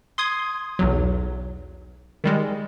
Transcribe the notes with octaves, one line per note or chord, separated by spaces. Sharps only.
C6 D#6 G#6
B1 E2 F#3
D#3 G3 G#3